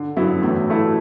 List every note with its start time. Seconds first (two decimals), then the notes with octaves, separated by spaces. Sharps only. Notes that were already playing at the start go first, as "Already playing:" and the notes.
Already playing: D3
0.16 F#2 F#3 B3 E4
0.42 E2 A2
0.68 F#3 A3 E4